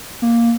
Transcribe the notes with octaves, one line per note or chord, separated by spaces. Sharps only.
A#3